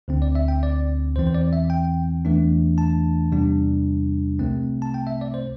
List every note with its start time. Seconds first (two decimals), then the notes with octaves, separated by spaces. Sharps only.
0.08 D2 D3 C4
0.22 D5
0.35 E5
0.48 G5
0.63 D5
1.16 E2 E3 C4 C5
1.27 C5
1.35 D5
1.53 E5
1.70 G5
2.25 E2 E3 A3 D4
2.78 A5
3.32 E2 C3 G3 D4
4.39 C2 C3 A3 C4
4.82 A5
4.94 G5
5.07 E5
5.21 D5
5.34 C5